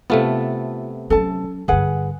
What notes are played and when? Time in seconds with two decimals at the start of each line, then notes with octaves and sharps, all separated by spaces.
0.10 C3 A3 B3 F4 A4
1.10 F#3 C#4 A4 A5
1.68 G2 D3 G#4 B4 F#5